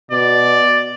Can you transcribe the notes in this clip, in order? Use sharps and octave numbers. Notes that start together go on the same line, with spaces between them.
B2 D5